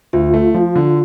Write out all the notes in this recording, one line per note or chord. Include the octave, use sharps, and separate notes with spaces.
D2 F4
A3
F3
D3